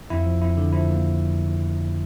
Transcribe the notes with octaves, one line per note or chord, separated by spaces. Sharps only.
F2 E4
F3
F2 E4
D3
F3 E4
A#3